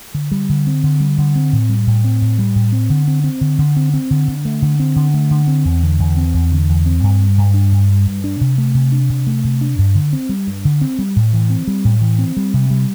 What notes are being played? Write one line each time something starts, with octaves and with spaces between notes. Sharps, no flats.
D3
G3
D3
C4
D3
G3
D3
C4
A2
G3
A2
C4
A2
G3
A2
C4
D3
C4
C4
D3
D3
C4
C4
D3
D3
A3
D3
C4
D3
A3
D3
C4
E2
D3
E2
C4
E2
D3
E2
C4
G2
G3
G2
D4
G2
G3
G2
D4
C3
A3
C3
D4
C3
A3
C3
D4
G2
D3
C4
G3
G2
D3
C4
G3
A2
E3
C4
G3
A2
E3
C4
G3
C3
G3